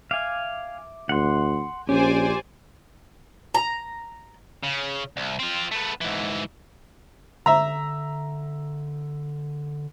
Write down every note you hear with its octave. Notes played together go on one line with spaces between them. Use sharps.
E5 F5 G#5 D6
D2 F#5 C6
A#1 C#4 G4 C5 D5 G#5
A#5
C#3
C2
C4 F4
A3 B3
G#2 E3
D3 E5 A#5